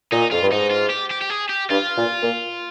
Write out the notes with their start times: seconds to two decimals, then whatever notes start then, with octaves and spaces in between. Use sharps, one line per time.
0.12 A#2 D#4
0.31 F2 F4
0.42 G2
0.51 G#2 D#4
0.71 F4
0.90 G4
1.11 G4
1.22 G4
1.30 G#4
1.49 G4
1.70 G2 F4
1.96 A#2
2.22 A#2